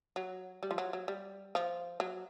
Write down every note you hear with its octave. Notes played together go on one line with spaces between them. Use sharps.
F#3
G3
F3
F#3
F#3
G3
F3
F#3